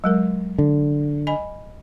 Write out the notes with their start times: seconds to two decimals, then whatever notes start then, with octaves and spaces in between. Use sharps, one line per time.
0.04 F#3 G#3 A#4
0.59 D3
1.27 D#5 G#5 B5